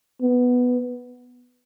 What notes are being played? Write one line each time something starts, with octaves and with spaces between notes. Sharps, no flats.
B3